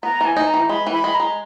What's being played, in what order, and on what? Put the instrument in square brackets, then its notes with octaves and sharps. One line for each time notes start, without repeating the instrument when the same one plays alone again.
[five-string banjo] B3 [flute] A#5
[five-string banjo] E3 [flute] G#5
[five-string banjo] D#4
[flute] A#5
[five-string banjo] E3
[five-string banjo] G#3 [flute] B5
[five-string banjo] E3
[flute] B5
[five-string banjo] G#3
[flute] A#5
[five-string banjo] G#3